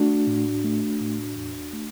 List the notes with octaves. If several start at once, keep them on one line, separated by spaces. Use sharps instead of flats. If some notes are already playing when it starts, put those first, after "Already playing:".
Already playing: A3 D4 F#4
A2
A3
A2
E2
A3